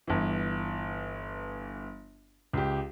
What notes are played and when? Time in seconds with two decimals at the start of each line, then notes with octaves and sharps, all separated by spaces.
0.08 G1 E3
2.53 C#2 G4